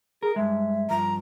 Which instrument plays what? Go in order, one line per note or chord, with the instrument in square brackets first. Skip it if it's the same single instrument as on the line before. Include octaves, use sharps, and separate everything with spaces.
[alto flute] G#4 [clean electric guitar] A#4
[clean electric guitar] G2 G#3 [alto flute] E5
[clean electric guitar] G2 F3 [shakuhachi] A#5